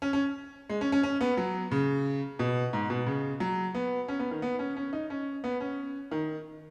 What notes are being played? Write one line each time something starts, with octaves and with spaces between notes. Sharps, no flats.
C#4
C#4
G#3
C#4
C#4
C#4
B3
F#3
C#3
B2
G#2
B2
C#3
F#3
B3
C#4
B3
D#3
B3
C#4
C#4
D#4
C#4
B3
C#4
D#3